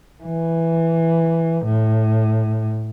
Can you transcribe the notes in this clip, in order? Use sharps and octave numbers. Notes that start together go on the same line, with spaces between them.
E3
A2